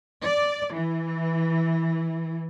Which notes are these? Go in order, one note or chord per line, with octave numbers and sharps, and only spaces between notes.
D5
E3